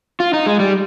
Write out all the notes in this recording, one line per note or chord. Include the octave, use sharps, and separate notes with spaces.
F4
D#4
G#3
G3